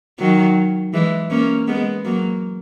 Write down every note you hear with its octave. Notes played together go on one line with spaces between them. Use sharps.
D#3 F#3
E3 G#3
A#3 C#4
G#3 B3
F#3 A#3